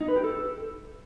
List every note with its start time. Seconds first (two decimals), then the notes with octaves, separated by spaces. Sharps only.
0.01 D#4
0.08 B4
0.16 G4
0.24 A4